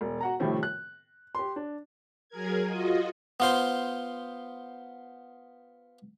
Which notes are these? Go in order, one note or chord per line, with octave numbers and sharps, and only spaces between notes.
E1
F#4 F#5 A#5
A2 C3 D#3 F3 G3 A3
F#6
G4 C6
D4
F#3 G#4 A#4 G#6
F4 F#4 D#5
B3 F4 C5